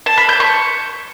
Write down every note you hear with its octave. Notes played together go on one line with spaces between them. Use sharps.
A5
B5
G6
C#6